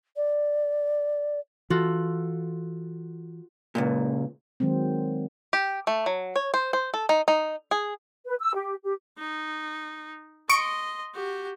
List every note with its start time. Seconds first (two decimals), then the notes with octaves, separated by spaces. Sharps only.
0.16 D5
1.70 E3 F4 F#4 A4
3.75 C#2 F#2 A#2
4.60 D#3 F#3 G#3 C4
5.53 G4
5.87 A3
6.06 F#3
6.36 C#5
6.54 C5
6.73 C5
6.94 A4
7.09 D#4
7.28 D#4
7.71 G#4
8.27 B4
8.40 E6
8.54 G4
8.84 G4
9.19 D#4
10.49 D#5 C6 C#6 D7
11.15 F#4 G4